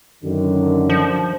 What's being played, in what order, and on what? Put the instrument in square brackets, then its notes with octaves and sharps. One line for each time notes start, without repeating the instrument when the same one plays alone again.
[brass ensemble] F#2 D3 D#3
[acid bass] F3